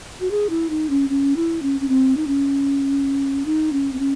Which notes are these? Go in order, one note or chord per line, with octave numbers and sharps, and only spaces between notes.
F#4
G#4
E4
D#4
C#4
C#4
E4
C#4
C#4
C4
D#4
C#4
D#4
C#4
C4
C#4